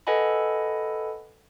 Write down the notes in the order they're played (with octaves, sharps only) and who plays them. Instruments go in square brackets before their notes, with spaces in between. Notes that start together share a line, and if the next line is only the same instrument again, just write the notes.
[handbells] A4 B4 D#5 F#5 G#5 B5